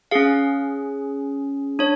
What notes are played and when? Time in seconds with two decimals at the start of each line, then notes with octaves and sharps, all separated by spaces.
0.11 C#4 G#4 F5
1.79 D4 C#5